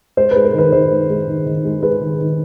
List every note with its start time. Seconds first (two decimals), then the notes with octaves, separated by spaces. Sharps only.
0.17 G#3 C5
0.31 G#3 B4
0.44 A#4
0.54 D#3 B4
0.72 D#3 C5
0.91 G#3
1.09 G#3
1.28 D#3
1.46 D#3
1.64 G#3
1.82 G#3 B4
2.01 D#3
2.20 D#3